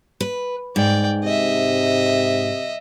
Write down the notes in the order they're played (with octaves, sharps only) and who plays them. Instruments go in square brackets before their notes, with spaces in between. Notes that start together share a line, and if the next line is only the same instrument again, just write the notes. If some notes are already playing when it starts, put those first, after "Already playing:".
[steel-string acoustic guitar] B4
[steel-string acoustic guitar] G#2 [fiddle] D5 G5
[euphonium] C3 [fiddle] D#5 E5